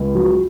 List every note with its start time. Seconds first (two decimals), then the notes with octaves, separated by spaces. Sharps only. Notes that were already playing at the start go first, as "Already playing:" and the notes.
Already playing: C#2
0.15 F#3